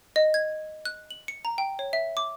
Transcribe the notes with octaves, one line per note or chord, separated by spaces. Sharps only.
D#5
G#6
F#6
F#7
C#7
A#5
G5
C#5
E5
D6